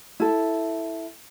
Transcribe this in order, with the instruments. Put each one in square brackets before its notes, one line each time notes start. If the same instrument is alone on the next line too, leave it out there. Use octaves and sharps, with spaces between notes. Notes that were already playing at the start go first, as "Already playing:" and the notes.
[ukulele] E4 A4